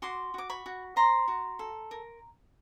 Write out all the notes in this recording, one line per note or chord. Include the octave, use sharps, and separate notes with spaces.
F#4 C6 D6
F#4 D6
B5 C#6
F#4
C5 A#5 C6
F#4
A4
A#4